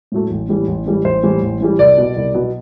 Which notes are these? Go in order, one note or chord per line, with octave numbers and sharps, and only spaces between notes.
A2 F#3 A3
A1
A2 E3 G3
A1
A2 E3 G3
A1 C5
A2 E3 G3
A1
A2 E3 G3
C2 D5
B2 F#3 B3
C2
B2 F#3 B3